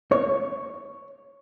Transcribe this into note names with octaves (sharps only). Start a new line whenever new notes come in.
C#5